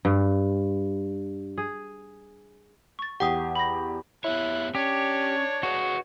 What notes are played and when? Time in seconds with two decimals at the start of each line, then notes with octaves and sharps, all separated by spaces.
0.05 G2
1.58 G#4
2.99 C#6 A6
3.20 E2 G4 F#5 G5 D#6
3.55 B5 A#6
4.24 B3 E4 G4 C#5 F#6
4.75 C#4 D4 G4 C#5
5.63 F#4 G#4 B4 D#5